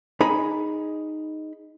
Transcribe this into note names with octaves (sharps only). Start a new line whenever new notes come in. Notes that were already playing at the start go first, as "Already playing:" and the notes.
D#4 G#4 B5